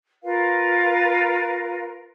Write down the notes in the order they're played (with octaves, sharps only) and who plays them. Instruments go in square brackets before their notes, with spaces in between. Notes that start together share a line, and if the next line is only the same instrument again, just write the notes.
[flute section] F4 A#4 B4 F5